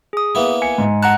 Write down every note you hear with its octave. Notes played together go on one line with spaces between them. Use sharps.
G#4 D#6
A#3 B3 E4
G#5 C#7
G#2
F#5 A5 A#5 F#6